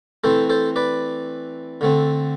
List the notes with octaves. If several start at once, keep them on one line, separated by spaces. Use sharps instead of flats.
E3 A3 C4 A4 C5
A4 C5
B4 D5
D3 A3 C4